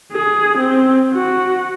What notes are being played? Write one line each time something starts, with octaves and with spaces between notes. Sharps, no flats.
G#4
C4
F#4